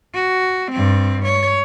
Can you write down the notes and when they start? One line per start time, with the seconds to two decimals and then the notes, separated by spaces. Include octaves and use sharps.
0.14 F#4
0.72 G2 C4
1.26 C#5